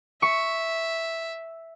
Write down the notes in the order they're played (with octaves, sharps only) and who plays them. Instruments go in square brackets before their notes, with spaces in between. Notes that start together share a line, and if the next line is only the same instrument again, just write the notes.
[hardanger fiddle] E5 [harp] C#6